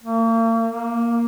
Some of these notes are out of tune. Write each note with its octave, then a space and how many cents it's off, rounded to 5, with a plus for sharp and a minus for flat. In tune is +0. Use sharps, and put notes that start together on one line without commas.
A#3 -40
A#3 +5